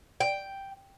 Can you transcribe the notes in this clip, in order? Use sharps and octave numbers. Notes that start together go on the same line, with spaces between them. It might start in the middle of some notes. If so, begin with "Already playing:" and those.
G5